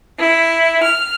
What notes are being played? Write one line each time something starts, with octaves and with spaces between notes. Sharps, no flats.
E4
F6